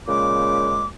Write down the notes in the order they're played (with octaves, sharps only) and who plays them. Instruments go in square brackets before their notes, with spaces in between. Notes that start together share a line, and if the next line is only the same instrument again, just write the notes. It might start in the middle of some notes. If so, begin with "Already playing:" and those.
[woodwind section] A#2 C#3 G#3 D6